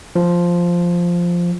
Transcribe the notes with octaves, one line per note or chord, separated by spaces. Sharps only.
F3